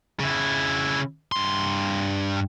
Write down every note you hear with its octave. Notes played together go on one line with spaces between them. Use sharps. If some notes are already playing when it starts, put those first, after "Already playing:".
C#3 E4
G2 C6